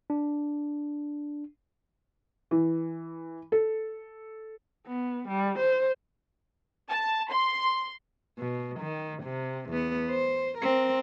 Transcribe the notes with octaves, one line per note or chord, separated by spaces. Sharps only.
D4
E3
A4
B3
G3
C5
A5
C6
B2
D#3
C3
E2 B3
C5
C4 A#4